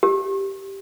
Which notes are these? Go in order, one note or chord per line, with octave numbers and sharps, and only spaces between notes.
G4